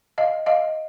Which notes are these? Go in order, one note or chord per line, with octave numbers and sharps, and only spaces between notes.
D#5 F5
D#5 F5